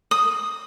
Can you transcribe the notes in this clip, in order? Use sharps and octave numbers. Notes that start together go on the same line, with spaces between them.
D#6